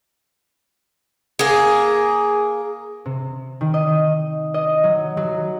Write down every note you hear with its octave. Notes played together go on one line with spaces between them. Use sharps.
A#3 G#4
C3
D#3
D#5
D#5
F#3
F#3